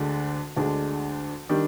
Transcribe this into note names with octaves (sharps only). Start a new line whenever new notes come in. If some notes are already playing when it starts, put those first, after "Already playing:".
Already playing: D2 D3 G#3 D4
D2 D3 G#3 D4
D#3 G3 D4